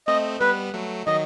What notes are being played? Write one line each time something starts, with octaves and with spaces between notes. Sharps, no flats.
A3 C4 D#5
G3 B3 B4
F#3 A3
D#3 F#3 D#5